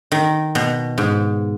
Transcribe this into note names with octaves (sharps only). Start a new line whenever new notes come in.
D#3
B2
G#2